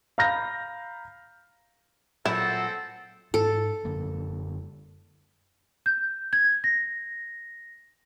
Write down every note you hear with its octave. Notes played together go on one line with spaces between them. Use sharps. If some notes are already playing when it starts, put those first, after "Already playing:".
F5 A#5 B5 F6 G6 A#6
A#2 F#3 C4 E4 A4 F#5
G#2 A4
F#2 D3 A#3
G6
G#6
A#6